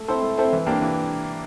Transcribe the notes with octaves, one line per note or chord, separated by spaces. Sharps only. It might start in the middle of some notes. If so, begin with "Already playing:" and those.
Already playing: A3
C4 E4 A4 C5
A3
C4 E4 A4 C5
E3
A#3 D4 G4
E3